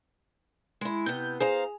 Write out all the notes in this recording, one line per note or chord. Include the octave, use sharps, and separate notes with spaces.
G#3 E4
C3 B3 G6
G#4 C5 F5 A#5